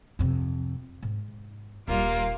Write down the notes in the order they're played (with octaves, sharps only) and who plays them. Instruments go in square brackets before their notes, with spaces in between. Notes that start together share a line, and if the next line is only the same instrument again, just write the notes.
[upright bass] F2 C3
G#2
[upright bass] D#1 D4 [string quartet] G3 A#3 F4